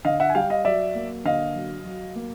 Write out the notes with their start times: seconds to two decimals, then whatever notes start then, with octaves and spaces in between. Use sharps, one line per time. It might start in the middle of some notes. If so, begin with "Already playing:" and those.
0.05 D3 D#5 F5
0.20 E5 F#5
0.30 G#5
0.35 G3 F5 G5
0.50 D#5 F5
0.65 F#3 D5 E5
0.95 A#3
1.25 D3 D#5 F5
1.55 F#3
1.85 F#3
2.16 A#3